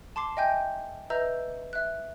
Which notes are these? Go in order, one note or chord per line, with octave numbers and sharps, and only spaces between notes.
A5 C6 D6 C7
D#5 E5 G5 G#5 G6
B4 D#5 E5 A#5 E6 G6
E5 F#6